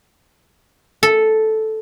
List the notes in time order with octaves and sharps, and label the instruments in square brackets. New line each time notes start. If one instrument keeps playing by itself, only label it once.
[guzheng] A4